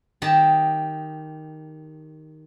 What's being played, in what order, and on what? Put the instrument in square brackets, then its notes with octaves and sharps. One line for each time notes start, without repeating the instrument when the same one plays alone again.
[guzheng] D#3 G4 D#5 A5